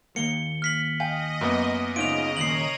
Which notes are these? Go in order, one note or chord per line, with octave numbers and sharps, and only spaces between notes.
D#2 A#3 C#7 G7
F6 B6 F#7
D#5 F5 G5 G#5
F#2 A#3 B3
C#3 C#4 D#4 F4 D#5 D7 F7
D#2 A#2 C#5 A#5 C7 D#7 F#7